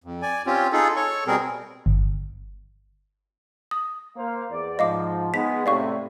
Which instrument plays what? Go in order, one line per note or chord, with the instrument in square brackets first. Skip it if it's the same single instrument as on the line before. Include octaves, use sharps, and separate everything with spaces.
[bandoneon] F2
D5 G#5
C4 C#4 F4 G4
D#4 F4 G#4 A4
A4 C#5 C#6
B2 G3 C4 G#4 A#4
[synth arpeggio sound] G1
[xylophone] D#6
[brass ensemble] A#3 C5 F5
E2 D5
[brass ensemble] G#2 F3 [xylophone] D#5 F5 D6
[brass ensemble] G#3 B3 D#4 [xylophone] B6
[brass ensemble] A2 C3 [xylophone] D5 F5 C#6